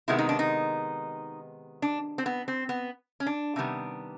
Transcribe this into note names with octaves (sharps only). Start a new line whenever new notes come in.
C3 D#3 G#3 B3 E4
D#4
D4
D#4
D4
C4
B3
C4
B3
C#4
D4
C3 D#3 G3 B3